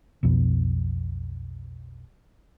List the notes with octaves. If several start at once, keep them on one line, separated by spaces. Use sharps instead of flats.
B1 F2 B2